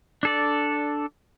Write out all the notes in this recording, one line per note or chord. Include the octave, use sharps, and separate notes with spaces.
D4 A4 D5